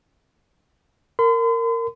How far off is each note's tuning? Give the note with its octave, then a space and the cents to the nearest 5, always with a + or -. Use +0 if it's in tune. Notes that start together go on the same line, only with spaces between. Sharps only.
A#4 -15 C6 -45